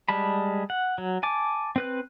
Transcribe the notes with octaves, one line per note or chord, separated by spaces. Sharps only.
G3 G#3 A5 B5
F#5
F#3
G#5 A5 D6
C4 B4 F#6